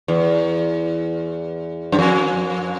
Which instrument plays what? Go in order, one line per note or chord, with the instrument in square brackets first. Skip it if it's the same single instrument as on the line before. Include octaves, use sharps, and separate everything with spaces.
[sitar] E2
F#2
F2